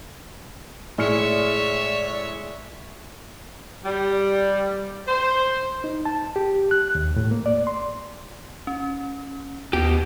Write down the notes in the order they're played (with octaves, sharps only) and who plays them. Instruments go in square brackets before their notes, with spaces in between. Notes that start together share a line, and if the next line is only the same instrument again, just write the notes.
[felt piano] A2 F6 C#7 [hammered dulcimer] G#3 [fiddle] C#5 E5 [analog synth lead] D5
[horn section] G3
C5
[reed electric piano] D#4
A5
G4
F#6
D#2
A2
A#3
D5
C6
[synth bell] C#4
[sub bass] D#2 [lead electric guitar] B2 [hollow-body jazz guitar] G4